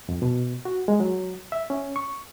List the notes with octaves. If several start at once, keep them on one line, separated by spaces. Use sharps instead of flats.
F2
B2
F#4
G#3
F#3
E5
C#4
C#6